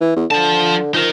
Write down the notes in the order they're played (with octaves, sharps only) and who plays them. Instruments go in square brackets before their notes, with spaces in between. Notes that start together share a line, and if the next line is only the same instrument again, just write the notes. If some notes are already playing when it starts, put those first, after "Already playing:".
[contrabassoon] E3
E2
[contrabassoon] D3 [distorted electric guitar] F3 A5
[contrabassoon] F3 [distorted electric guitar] D#4 A#4